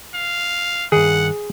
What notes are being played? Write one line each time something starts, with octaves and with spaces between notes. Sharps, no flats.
F5
G2 D#3 G#4 F#5